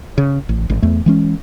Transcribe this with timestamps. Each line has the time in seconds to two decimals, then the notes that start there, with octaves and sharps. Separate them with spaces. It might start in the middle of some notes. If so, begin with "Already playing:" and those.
0.18 C#3
0.49 A1
0.70 G#1
0.82 E2 A3
1.06 E3 G#3 C#4